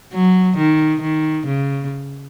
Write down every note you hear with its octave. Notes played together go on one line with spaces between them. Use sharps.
F#3
D#3
D#3
C#3